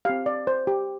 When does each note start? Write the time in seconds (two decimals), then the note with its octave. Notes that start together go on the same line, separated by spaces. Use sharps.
0.05 C4 G4 F5
0.26 D5
0.47 C5
0.67 G4